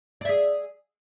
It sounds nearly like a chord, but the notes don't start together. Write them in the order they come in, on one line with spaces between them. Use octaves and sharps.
D5 E5 G#4